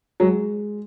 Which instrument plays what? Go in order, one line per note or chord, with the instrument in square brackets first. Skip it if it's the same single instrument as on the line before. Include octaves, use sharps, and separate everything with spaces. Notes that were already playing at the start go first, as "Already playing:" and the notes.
[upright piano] F#3 [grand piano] G#3